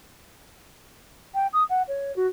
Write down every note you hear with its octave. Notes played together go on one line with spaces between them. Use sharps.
G5
D#6
F#5
C#5
F#4